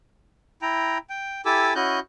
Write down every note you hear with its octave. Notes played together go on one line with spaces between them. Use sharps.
E4 G5 A#5
G5
E4 G4 A4 G#5 D6 E6
C#4 E4 F#4 D#5 F#6 G6